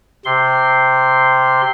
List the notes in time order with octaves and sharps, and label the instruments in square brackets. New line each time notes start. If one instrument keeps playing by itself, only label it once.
[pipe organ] C3 C6